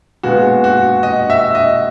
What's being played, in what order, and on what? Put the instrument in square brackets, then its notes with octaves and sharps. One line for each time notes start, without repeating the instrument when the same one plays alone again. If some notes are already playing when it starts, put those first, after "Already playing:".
[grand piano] A#2 G#3 B3 F#4
F#4
D#5
E5
D#5